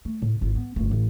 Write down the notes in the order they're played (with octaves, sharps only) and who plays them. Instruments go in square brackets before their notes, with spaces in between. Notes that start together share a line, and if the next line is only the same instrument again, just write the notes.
[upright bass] A3
A2
G#1 F4
B3
G1 A3
A1